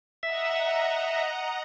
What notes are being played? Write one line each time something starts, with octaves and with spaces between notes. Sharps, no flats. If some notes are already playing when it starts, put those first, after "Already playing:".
D#5 E5 F#5 A#5